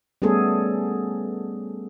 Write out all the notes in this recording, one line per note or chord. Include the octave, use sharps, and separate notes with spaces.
G3 A3 B3 C#4 G#4 A4